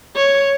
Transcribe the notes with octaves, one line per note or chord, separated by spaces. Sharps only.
C#5